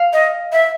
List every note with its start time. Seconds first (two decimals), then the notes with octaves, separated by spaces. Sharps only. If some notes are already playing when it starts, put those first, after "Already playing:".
Already playing: F5
0.13 D#5
0.52 E5